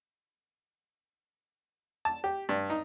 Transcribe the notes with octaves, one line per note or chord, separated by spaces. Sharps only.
A5
G4
G2
D#4